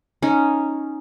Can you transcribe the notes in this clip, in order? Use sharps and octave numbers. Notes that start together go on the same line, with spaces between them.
C#4 D#4